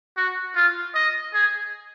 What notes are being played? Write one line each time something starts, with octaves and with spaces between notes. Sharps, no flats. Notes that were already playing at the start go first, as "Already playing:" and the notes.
F#4
F4
D#5
G#4